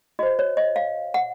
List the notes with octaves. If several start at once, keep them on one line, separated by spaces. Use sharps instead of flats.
F#4 C5 D#5
C#5
D#5
F5
F#5